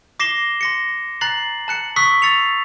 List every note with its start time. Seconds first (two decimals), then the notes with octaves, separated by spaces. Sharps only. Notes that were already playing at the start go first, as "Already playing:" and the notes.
0.20 D6 A#6 C7 E7 G7
0.61 C6 A#6 C#7
1.21 A#5 F#6 A6 C7 F#7
1.68 A5 F#6 C#7 F#7
1.96 C#6 D#6 E6 F#6 B6
2.22 E6 A6 C7 C#7 F7